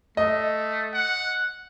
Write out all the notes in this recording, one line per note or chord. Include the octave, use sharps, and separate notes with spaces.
A3 D#5
F#5